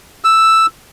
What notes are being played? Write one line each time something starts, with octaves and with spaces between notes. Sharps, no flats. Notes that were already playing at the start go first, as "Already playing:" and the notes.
E6